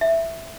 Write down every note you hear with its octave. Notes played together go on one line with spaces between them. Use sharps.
E5